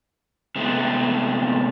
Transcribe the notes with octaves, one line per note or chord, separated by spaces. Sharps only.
C3 G#3 A3 B3